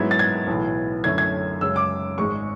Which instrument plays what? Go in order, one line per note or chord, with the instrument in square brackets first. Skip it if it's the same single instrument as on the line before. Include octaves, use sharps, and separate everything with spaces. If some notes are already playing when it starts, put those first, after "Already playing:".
Already playing: [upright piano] G#2 F#3 B3 E4 G#6
A6
G#6
B1 A2 E3 B3
F#2 D3 A3 C#4 E4 G#6
G#6
F#2 C#3 G#3 E6
D6
G#1 G#2 G#3 C#6